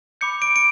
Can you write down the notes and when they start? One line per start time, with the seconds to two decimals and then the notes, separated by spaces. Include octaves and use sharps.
0.21 B5 D6 G6 C#7
0.42 D7
0.56 D7